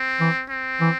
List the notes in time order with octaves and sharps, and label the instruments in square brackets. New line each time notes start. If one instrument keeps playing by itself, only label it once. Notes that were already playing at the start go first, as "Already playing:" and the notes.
Already playing: [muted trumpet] C4
[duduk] E3
[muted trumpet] C4
[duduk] E3